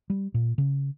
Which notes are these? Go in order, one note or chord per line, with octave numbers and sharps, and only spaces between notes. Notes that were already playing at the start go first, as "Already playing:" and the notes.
G3
A#2
C#3